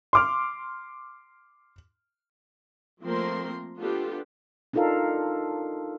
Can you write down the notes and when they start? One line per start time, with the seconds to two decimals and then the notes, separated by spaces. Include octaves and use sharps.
0.13 C6 D6 F6
3.02 F3 A3 A#3 C4 A#4 C6
3.78 B3 D4 F4 G4 A4
4.73 D4 D#4 F4 A4 A#4 F5